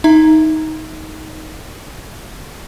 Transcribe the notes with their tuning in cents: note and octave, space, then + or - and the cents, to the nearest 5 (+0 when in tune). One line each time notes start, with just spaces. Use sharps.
D#4 +15 E5 +0 A#5 +0